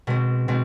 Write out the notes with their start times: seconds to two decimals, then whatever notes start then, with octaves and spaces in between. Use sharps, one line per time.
0.07 B2 G#3 C4
0.48 B2 G#3 C4